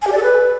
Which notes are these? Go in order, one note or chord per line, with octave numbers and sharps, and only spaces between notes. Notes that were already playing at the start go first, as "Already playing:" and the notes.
G#5
G4
D5
A4
B4